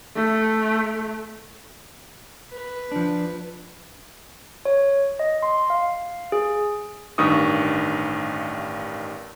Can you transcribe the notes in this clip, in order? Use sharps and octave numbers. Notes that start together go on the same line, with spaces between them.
A3
B4
F3 D4
C#5
D#5
C6
F5
G#4
A1 G2 D#3 C#6 D#6